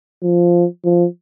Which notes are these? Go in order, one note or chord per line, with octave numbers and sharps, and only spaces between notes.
F3
F3